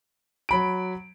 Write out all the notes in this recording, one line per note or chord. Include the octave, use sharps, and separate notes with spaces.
F#3 B5 D7